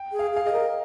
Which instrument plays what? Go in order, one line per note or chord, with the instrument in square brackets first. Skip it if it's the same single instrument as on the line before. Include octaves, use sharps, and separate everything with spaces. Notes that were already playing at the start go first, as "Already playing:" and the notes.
Already playing: [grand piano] G5
[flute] G#4
[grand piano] F5
[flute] G#4
[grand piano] F5
[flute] G#4 [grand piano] D#5
[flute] A#4